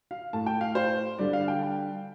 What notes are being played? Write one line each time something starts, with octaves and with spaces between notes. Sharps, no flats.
F5
A2 A3 A5
G5
F5
C5
D3 G3 D5
F5
G5
G5